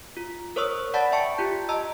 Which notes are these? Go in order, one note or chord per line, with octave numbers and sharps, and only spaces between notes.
F4
A#4 C5 C#5 C#6 D#6 E6
D5 F#5 A5 B5 A6
E5 G5 A5 C#6 C#7
F4 G4 G6
D#5 A5 A#5 E6